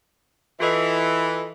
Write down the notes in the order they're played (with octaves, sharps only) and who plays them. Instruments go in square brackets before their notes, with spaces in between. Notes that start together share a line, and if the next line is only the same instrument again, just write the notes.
[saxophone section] E3 [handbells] F4 A4 D#5